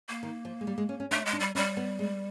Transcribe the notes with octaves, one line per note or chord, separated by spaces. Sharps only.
A#3
D#3
F3
G#3
G3
G#3
C#4
C#4
A3 D4
G#3
D4
G3
G3 C#4
B3
G#3